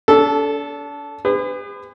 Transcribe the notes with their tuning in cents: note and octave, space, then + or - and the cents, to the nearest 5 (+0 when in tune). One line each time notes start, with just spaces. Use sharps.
D4 -40 A4 -5
G#4 -40 B4 +35